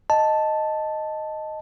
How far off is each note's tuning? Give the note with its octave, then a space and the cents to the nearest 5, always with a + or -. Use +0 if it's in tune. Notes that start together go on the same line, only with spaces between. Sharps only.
D#5 +0 A5 +0